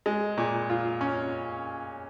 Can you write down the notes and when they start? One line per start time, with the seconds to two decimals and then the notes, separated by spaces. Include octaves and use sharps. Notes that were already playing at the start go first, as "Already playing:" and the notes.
0.06 G#3
0.38 A#2
0.70 F4
1.01 C#4